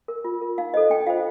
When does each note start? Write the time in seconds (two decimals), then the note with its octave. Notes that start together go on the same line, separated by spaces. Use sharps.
0.08 A#4
0.25 F4
0.41 A#4
0.58 D#4 F5
0.74 A4 C5 D#5
0.90 D4 G5
1.07 F4 F5
1.10 C5